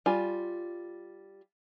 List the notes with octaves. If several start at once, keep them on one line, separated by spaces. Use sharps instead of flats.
G3 F4 G#5